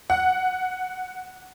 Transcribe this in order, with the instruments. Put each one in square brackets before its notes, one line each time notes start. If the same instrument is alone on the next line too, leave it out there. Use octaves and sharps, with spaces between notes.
[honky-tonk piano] F#5